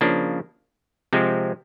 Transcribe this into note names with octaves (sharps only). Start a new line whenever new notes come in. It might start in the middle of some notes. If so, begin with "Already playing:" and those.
C#3 F3 A#3 D4
C3 F3 G#3 C4